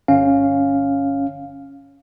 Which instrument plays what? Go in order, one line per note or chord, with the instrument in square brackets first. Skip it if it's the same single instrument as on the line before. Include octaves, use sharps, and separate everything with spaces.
[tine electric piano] G1 C#4 F5